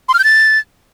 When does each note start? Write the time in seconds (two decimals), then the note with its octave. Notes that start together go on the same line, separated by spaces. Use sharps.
0.09 C6
0.14 F6
0.19 G6
0.24 A6